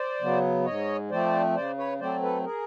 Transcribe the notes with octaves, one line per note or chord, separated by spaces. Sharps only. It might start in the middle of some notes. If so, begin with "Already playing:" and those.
Already playing: C5 D5
C#3 F#3 B3
G#2 C#5 D#5
F3 A3 C4 C5 D5
C#3 C5 D5
B4 C#5
F#3 A3 C4 C5 D5
A4 B4
G#4 A#4